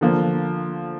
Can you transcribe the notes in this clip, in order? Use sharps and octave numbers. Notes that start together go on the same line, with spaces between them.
D3 F3 A#3